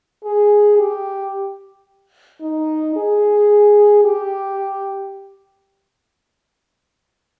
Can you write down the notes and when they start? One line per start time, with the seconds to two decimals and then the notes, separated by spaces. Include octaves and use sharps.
0.25 G#4
0.79 G4
2.41 D#4
2.96 G#4
4.05 G4